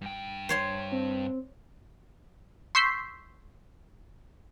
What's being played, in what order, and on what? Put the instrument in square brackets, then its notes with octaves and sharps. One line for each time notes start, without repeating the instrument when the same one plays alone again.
[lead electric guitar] G2 G5
[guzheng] C5 C#5 C6
[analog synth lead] C4
[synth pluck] C6 C#6 E6 G6 B6 C7